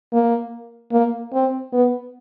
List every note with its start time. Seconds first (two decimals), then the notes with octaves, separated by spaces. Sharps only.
0.13 A#3
0.92 A#3
1.33 C4
1.73 B3